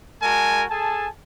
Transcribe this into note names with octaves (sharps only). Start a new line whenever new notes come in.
G#3 F#4 A#4 G#5 A5
G#4 A4 G#5 A5